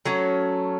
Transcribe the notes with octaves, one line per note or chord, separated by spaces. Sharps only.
F#3 A3 C#4